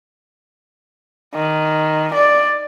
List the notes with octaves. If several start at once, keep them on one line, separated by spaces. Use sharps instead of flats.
D#3
D5